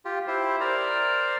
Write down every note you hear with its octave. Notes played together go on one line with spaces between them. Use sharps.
F4 G4
E4 G4 C5
A#4 C5 D5 A#5